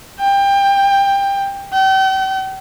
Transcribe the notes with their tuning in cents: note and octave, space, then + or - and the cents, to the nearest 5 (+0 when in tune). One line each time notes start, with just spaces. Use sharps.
G5 +20
G5 -40